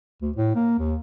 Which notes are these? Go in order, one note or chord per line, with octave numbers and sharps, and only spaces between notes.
D2
A2
A#3
D#2